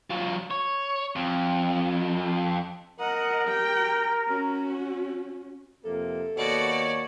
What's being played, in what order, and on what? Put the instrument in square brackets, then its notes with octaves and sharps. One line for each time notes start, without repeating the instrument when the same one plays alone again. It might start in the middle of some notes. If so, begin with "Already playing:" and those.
[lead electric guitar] F#3 F4
C#5
F2
[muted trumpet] A#4 [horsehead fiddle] D#5 F#5
[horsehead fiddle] G4 G5
C#4 F#4
[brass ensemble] F2 C3 A#3 [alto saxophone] A4
[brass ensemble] D#2 A#3 C#5 [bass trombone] B2 [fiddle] F#4 D5